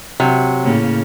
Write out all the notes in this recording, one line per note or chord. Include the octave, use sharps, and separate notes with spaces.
C3 F#3
A2 C#3 A#3